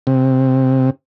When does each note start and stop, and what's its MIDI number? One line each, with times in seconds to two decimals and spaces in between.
0.07 0.90 48